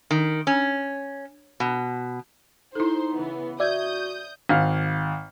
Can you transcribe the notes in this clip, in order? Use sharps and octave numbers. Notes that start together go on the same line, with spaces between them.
D#3
C#4
B2
D#4 E4 A4 C5 C6
C#3 E3 B3
F#4 D5 E5 D#6 G6 G#6
G#1 F5 F6